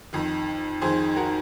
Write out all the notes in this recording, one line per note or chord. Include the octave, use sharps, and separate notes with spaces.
F2 D#3
F2 D#3 G#4 C5
F#4 A#4